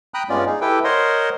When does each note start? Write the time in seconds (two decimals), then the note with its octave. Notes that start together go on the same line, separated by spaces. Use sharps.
0.14 G5 A#5 B5 D#6 F#6
0.29 G2 G#3 B3 C#4 F4 D5
0.46 D#4 G#4
0.61 E4 G4 A4 B4 G5
0.84 A#4 C5 C#5 D#5 F#5 C6